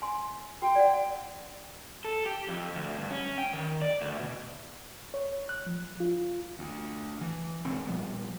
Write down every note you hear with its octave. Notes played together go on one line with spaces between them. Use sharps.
G#5 C6
F#4 G5
D5 F#5
A4
G4
F2
D2
G2
C#4
G5
D#3
D5
D2
B2
C#5
F#6
F3
F4
D2
E3
E1 C#2 F#2 C4
A#2 F3 G3 B3